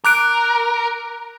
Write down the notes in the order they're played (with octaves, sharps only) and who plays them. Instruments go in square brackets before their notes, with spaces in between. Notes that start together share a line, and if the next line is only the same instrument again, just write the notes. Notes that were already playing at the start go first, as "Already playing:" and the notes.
[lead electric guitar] A#4 [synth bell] D6 F#6 D7